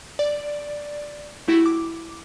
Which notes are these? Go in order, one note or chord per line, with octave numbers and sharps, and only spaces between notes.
D5
A3 E4 F#4 G4
D6